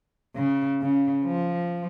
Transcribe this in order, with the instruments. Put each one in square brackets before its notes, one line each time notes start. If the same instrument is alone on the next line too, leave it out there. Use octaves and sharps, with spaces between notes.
[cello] C#3
C#3
F3